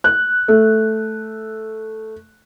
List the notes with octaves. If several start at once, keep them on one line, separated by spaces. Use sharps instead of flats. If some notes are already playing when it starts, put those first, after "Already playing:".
F#6
A3